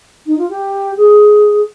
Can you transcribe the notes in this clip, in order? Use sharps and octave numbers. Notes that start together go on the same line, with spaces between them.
D#4
F4
G4
G#4